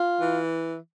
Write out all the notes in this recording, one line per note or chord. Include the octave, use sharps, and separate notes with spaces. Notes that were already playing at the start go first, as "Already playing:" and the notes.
Already playing: F4
E3